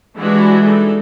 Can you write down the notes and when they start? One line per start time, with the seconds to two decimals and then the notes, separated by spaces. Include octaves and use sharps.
0.17 E3 G3 G#3 D4 E4 F#4
0.64 D#4 A4